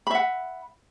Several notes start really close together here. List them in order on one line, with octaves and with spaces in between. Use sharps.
B5 E5 F#5